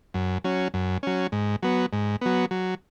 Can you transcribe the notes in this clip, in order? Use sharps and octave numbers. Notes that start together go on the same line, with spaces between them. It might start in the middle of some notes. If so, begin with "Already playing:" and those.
F#2
F#3 C#4
F#2
F#3 C#4
G#2
F#3 B3
G#2
F#3 B3
F#3